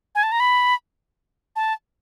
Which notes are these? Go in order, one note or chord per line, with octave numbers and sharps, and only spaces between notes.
G#5
A5
A#5
B5
A5